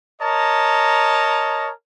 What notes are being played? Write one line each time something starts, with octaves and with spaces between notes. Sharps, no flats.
A#4 C#5 D#5 A5 A#5